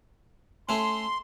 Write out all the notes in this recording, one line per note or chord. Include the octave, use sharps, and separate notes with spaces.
A3 C#4 C6